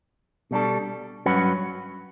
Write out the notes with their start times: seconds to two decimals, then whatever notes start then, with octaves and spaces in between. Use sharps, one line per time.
0.51 B2 G3 D4 A4
1.26 G2 F#3 C#4 F#4 B4